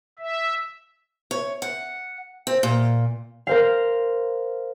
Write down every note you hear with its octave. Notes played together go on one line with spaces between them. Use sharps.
E5
C#5
F#5
C4
A#2
A#4 C5 F5